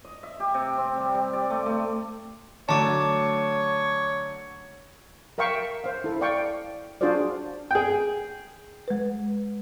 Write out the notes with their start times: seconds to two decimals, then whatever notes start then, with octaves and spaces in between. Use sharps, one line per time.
0.05 D#5
0.23 E5
0.40 G4
0.54 C3
0.78 C4
0.97 G3
1.15 G3
1.33 D5
1.50 A3
1.66 A3
2.69 D3 F#3 A3 C#5 A5 D6
5.38 A#4 E5 F5 G5 C#6
5.84 C5 F5
6.04 E4 A4
6.21 D5 F5 G5 C#6
7.01 D4 F4 F#4 G#4 C5 D5
7.71 G#4 G5
8.88 G#3 B4